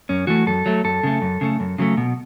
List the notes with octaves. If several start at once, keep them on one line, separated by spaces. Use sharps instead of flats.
F#2 C#4
E3 A3 F#4
F#2 A4
F#3 A3
F#2 A4
C#3 A3
F#2
C#3 A3
F#2
C#3 F#3 A3
B2